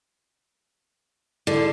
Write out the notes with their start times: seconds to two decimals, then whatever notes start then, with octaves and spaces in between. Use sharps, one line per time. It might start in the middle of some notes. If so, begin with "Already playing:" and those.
1.47 D3 E4 G#4 C7